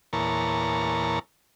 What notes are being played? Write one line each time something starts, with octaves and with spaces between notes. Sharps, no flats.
E2 A#2 C#5 A5 A#5